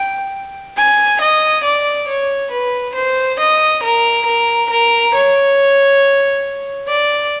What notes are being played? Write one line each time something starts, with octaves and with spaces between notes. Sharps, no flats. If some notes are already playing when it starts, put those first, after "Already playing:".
Already playing: G5
G#5
D#5
D5
C#5
B4
C5
D#5
A#4
A#4
A#4
C#5
D5